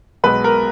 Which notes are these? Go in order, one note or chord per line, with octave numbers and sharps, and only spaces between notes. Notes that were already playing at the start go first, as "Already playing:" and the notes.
B1 B2 G#3 B4
A#4